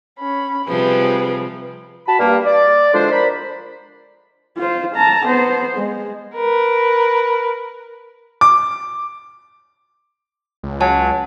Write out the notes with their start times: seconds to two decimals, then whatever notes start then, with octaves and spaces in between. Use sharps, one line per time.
0.19 C#4 B5
0.66 C3 F3 G3 G#4 B4
2.07 F#4 A5 B5
2.20 G2 A#3
2.46 D5
2.94 E2 D3 F3 G#3 D4 C5
3.12 A#4 C5 D5 B5
4.57 F4 C5
4.96 A5 A#5
5.26 B3 C5
5.78 G#3
6.35 A#4 B4
8.41 D6
10.63 C#2
10.81 F#3 G#5 A5